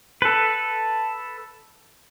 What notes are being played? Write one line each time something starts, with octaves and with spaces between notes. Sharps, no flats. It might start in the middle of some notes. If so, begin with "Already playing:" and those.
A4 B4